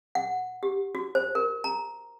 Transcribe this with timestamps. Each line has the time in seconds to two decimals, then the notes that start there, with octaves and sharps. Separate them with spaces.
0.15 F#5
0.63 G4
0.95 F#4
1.15 C5
1.35 A#4
1.64 A#5